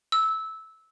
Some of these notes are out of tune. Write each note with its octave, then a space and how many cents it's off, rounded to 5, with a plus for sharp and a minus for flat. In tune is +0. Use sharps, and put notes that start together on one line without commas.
E6 -15